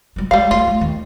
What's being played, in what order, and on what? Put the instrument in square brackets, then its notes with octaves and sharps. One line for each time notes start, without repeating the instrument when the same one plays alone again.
[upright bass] F#3 G#3
[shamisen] G3 F5 [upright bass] G#3
[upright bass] A3 [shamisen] F4
[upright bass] A3
D#2